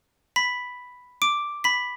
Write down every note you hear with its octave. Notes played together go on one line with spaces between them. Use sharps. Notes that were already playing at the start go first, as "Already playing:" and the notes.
B5 B6
D6 D7
B5 B6